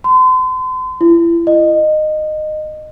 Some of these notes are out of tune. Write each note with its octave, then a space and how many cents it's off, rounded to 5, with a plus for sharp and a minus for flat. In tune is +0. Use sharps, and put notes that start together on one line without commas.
C6 -40
E4 +35
D#5 -20